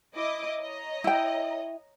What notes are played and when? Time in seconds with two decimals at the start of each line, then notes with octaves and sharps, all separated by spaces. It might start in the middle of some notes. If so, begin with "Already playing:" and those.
0.15 E4 D#5 D6
0.59 C#5 D#5 A#5
1.04 E4 G5